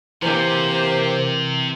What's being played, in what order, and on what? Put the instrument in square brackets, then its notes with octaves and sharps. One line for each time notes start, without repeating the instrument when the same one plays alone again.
[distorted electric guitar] C3 [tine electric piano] E3 [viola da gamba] A#3 G4 A#4 [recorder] C5